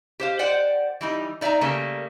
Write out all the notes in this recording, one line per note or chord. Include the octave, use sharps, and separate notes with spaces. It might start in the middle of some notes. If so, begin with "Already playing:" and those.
G4 C5 F5
C5 D5 F#5 G5
E3 G3 D#4
D#4 D5 E5 G5 A#5
C#3 G3 A3 A#3 A#4